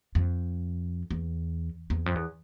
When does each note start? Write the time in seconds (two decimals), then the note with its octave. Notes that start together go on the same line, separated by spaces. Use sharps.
0.15 F2
1.11 E2
1.90 E2
2.06 F2
2.15 E2